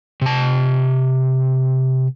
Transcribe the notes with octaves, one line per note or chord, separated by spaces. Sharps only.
C3 A5